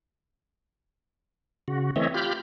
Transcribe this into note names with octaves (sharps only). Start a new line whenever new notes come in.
C#3 F#4
E3 A3 C4 C#5 D#5 E5
F4 G4 B5 F6 G6